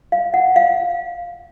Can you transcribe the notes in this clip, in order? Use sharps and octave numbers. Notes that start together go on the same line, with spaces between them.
F5
F#5
F5